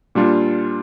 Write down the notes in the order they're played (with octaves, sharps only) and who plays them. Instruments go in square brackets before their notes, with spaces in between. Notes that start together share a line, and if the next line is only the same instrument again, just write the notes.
[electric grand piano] A#2 G3 D4 F4